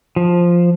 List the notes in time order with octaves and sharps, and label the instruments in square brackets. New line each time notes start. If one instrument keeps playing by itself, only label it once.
[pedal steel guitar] F3